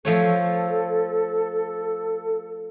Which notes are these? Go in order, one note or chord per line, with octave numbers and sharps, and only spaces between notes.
F3 A3 A4 C#5